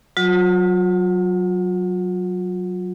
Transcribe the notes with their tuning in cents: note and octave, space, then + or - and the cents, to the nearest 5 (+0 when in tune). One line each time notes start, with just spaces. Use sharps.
F#3 +0 F4 +40